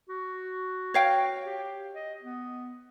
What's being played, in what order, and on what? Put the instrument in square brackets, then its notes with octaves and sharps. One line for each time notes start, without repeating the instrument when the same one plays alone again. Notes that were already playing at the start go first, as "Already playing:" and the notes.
[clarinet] F#4
[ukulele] C#5 F5 G5
[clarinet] G4
D#5
B3